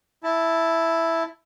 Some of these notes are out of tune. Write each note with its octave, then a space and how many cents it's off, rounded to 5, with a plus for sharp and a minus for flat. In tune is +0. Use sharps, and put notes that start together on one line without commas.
E4 +0 A5 +0